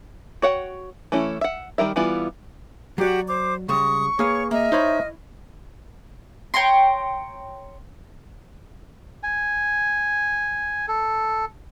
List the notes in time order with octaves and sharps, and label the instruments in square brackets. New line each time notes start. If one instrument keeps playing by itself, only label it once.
[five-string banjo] F#4 C#5 F#5 G5
E3 A3 C#4 E4
E5 F#5
D#3 G3 A#4 E5
E3 G3 B3 E4 F4
[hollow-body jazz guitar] F#3 D5 [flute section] F#4 G4 F#5
[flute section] C5 D6
[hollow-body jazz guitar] C#3 G3 G#3 [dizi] C#6 [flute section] D#6
[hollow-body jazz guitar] A#3 B4 [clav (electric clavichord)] G#4 F5 [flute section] C#5
[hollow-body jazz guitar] A#3 [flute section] D#5 F6 [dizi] E5
[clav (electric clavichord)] D#4 C5 C#5 [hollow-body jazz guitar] E4 B5
[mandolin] C#5 G5 A#5 C6
[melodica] G#5
A4